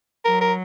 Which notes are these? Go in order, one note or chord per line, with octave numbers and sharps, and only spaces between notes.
F#3 A#4
A#4